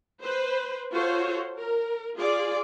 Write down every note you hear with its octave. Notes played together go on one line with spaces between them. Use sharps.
B4 C5
F4 F#4 A4 C5 C#5
A#4
F4 G#4 D5